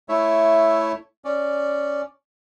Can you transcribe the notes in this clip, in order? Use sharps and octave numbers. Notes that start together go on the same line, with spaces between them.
A3 E4 C#5 E5
C#4 D5